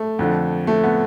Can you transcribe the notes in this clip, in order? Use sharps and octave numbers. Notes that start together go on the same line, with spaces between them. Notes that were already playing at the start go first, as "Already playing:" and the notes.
Already playing: A3
F2 D3 F3
A3
B3